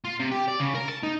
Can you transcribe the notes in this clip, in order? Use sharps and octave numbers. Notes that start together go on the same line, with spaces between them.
F4
C3
G4
D5
C#3
A#4
A5
D#4